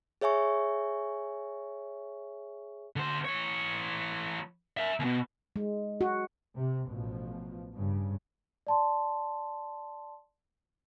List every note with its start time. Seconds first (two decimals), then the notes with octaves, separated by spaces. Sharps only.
0.21 G#4 C#5 E5 G#5 C#6
2.96 D3 C5
3.25 E3 C#5
4.77 A#4 E5
5.00 D#2 B2
5.56 G#3
6.01 F#4
6.56 C3
6.87 A1 B2 F3
7.75 G2 C#3
8.67 D5 A5 C6